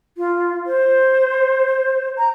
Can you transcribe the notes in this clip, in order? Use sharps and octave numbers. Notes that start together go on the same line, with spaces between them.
F4
C5
A#5